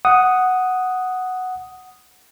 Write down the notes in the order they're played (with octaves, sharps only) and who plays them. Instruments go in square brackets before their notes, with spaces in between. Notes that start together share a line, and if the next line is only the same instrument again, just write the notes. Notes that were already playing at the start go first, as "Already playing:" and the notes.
[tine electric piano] F#5 D#6